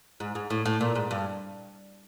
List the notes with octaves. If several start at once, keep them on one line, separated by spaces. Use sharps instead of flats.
G#2
G#2
A2
A2
A#2
G#2
G2